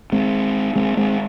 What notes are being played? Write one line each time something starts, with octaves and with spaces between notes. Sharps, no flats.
G#3 C4
G#3 C4
G#3 C4